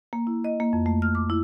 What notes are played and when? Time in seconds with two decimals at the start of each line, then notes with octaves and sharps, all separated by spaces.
0.13 A#3
0.27 E4
0.44 D#5
0.60 A#3
0.73 F2
0.86 A3
1.02 F6
1.15 D6
1.30 E4